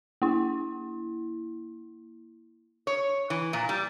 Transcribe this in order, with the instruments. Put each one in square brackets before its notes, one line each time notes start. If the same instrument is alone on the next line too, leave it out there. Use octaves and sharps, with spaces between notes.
[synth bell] A#3 E4
[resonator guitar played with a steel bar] C#5
E3
A#2
G3